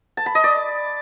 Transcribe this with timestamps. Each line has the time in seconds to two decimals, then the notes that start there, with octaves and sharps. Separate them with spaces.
0.17 A5
0.26 B5
0.35 D#5
0.44 D5